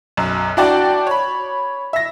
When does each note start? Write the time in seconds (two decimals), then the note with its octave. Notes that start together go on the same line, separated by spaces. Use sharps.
0.17 B1 F#2
0.57 D4 E4 F#4 D5 G5 A5
1.07 C#5 B5
1.93 E5 A#6